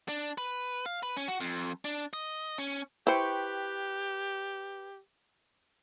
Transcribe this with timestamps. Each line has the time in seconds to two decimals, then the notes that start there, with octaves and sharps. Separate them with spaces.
0.09 D4
0.38 B4
0.86 F5
1.03 B4
1.17 C#4
1.28 F#4
1.40 F2
1.85 D4
2.13 D#5
2.58 C#4
3.07 E4 G4 B4 C5 G5 C#6